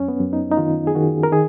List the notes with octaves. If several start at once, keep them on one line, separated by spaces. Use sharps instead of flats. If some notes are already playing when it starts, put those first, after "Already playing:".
Already playing: F#2 C#4
B3
F#2
D#4
D#4
D#3 F4
G#4
D#3 F#4
A#4
D#3 G#4